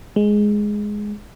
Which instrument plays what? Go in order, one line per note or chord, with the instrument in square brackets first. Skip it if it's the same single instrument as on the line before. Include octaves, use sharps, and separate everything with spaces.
[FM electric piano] G#3